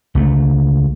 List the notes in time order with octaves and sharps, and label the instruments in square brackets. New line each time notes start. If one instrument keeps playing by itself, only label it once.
[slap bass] C#2 A3